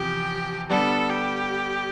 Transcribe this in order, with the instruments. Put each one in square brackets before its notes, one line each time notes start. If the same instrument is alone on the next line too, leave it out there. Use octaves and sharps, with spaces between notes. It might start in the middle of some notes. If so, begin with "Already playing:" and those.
Already playing: [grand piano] E2 C3 F3 [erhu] G4
[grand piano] D3 G3 B3 D4 [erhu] A4
[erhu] G4